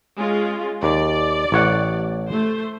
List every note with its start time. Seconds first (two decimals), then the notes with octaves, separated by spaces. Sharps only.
0.17 G#3 C#4 F4
0.83 D#2 D5
1.52 A1 C#5 F#5
2.28 A3 C5